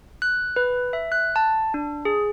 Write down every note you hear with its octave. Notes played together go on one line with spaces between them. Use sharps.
F#6
B4
E5
F#6
A5
D4
G#4